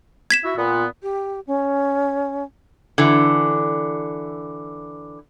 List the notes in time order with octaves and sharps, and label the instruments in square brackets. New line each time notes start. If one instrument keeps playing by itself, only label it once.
[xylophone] G#6 B6 E7
[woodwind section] E4 F#4 E5
A#2 B3
[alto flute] G4
C#4
[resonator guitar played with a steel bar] D3 E3